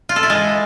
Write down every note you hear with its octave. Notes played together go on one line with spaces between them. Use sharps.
F4
A4
E4
G#3